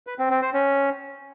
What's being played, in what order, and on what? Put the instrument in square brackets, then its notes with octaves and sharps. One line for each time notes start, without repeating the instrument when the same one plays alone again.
[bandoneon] B4
C4
C4
C5
C#4